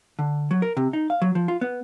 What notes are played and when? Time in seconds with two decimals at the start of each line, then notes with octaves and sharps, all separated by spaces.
0.19 D3
0.51 F#3
0.62 A#4
0.77 C3
0.93 D#4
1.10 F5
1.22 F#3
1.35 F3
1.48 F4
1.61 B3